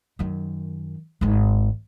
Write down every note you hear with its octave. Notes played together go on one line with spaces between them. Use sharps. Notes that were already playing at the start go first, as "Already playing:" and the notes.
F#2 D#3
G#1 G#2